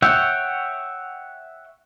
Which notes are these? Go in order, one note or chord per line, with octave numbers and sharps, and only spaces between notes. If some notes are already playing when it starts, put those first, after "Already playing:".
C#5 E5 F#5 G5